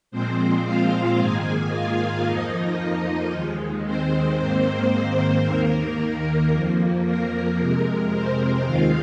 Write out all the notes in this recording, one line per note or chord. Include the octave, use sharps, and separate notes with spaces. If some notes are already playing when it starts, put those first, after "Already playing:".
A#2 F3 G#3 C4 C5
F4 F5
G#2 D#3 A#3 G#4 G#5
F4 F5
F2 F3 A#3 D#4 D#5
D#2 D#3 G#3
C4 C5
G#2 D#3 A#3 C4 C5
C4 C5
D#2 D#3 A#3 A#4
A#4
F2 F3 A#3
A#4
F2 C3 G#3 A#4
C4 C5
D#2 D#3 G#3 F4 F5